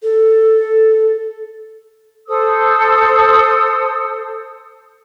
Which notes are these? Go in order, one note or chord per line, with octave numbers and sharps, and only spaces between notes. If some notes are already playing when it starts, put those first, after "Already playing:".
A4
A4 C5 D#6 E6